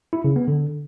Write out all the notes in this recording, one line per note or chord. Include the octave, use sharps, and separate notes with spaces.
E4
C#3
B3
D3